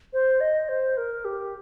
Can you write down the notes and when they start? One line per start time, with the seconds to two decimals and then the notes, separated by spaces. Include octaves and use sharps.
0.13 C5
0.40 D#5
0.69 C5
0.97 A#4
1.25 G4